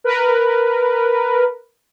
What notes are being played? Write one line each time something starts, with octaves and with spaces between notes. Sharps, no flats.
A#4 B4